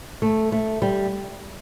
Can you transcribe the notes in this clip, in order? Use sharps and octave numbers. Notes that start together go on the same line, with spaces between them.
A3
A3
G3